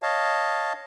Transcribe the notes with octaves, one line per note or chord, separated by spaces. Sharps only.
C#5 D#5 F5 A5